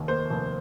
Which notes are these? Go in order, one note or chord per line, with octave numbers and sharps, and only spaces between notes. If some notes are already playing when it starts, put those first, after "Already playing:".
Already playing: F1 D#2 D#3
A#3 C5
F1